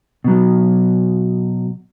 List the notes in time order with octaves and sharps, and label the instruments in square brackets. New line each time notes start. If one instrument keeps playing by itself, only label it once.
[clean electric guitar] B2 F#3